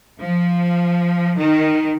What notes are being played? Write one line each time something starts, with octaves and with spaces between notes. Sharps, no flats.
F3
D#3